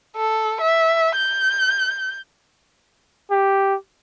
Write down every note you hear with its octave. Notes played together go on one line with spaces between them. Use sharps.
A4
E5
G6
G4